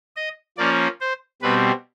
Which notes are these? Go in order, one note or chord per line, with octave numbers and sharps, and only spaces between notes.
D#5
F3 A#3 C#4 D5
C5
B2 G3 C4 B4